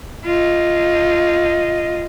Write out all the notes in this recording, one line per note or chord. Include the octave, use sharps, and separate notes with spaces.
F4 D#5